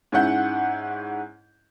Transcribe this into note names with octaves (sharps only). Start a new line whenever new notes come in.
G#2 C#4 E4 F#5 G6